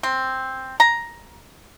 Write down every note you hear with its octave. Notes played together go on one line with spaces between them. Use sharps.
C4
A#5